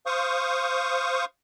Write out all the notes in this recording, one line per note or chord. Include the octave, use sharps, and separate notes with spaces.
C5 F5 C#6 D#6